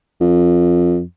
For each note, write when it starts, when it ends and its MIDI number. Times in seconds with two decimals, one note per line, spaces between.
0.21 1.03 41